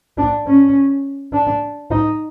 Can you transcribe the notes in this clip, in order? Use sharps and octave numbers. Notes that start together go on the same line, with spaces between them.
D4
C#4
D4
D#4